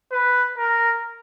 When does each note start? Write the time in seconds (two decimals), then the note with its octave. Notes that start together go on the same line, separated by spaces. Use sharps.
0.12 B4
0.58 A#4